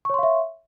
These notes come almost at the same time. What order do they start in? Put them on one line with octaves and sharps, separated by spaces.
C#6 C#5 C6 F5 E5